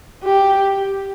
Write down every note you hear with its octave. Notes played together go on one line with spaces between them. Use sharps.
G4